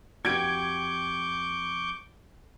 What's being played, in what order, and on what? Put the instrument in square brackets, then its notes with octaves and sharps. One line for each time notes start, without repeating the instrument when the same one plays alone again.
[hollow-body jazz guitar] F2 F#4 G4 [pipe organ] C#6 D6 G6 [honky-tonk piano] G#6 D7